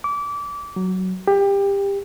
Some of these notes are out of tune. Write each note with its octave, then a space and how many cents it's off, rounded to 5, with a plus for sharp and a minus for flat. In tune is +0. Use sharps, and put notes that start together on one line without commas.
D6 -25
F#3 +10
G4 +20